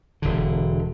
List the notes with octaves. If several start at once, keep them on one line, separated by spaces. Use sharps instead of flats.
E1 D3